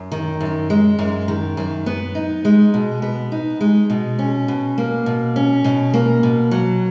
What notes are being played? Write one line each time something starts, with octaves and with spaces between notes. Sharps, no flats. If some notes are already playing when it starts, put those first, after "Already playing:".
Already playing: F#2
D#3
F#2
G#3
F#2
D#3
F#2
B3
D#4
G#3
B2
B3
D#4
G#3
B2
C#4
B2
A#3
B2
C#4
B2
A#3
B2
F#3